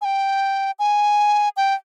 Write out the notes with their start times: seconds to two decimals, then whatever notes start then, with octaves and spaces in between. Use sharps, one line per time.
0.01 G#5
0.05 G5
0.79 G#5
1.57 G5